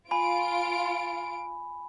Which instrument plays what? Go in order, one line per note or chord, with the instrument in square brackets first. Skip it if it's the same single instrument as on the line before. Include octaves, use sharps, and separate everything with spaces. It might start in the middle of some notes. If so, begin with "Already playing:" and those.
[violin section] F4 D7 [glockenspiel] G#5 B5